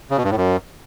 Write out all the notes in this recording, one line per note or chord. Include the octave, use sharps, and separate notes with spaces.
C#3
B2
G2
A2
F#2